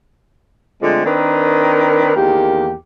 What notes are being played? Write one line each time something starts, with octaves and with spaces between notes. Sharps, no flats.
D3 F3 G#3 A3 C4
D#3 C4 D4 A#4 B4
E2 D#3 A#3 G4